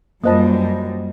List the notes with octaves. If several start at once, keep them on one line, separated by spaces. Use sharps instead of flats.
F#2 G3 A#3 F4 C5 D#5 A5 D#6